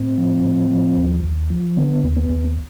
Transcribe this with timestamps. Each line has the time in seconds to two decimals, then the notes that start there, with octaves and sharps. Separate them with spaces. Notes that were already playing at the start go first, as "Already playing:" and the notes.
Already playing: A2 C4
0.18 F3
0.44 A2
0.71 F3
0.97 D#2
1.24 D#2
1.50 F3
1.77 D3 B3
2.03 D#2
2.17 B3
2.29 D#2